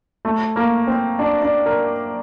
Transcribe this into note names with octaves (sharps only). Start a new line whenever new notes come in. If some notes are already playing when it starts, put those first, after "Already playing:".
A3
A#3
C4
D4
D4
A#4